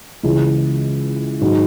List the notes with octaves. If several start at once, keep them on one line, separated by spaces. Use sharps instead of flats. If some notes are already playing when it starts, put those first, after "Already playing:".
C#2 C#3 E3 G#3
G#2 D#3 F#3